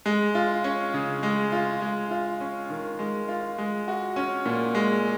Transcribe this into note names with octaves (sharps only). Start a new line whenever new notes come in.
G#3
F4
C#4
C#3
G#3
F4
G#3
F4
C#4
D#3
G#3
F4
G#3
F#4
C#4
A#2
G#3